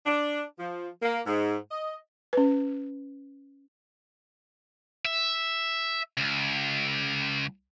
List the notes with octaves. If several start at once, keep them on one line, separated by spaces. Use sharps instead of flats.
D4
F3
A#3
G#2
D#5
C#4 B4
E5
C#2